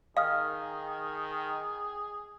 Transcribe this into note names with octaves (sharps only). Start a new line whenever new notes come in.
D#3 G#4 D#5 F5 D#6 F6